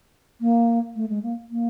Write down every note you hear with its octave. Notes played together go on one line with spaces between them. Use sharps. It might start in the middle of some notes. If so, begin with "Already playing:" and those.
A#3
A3
G#3
A#3
A#3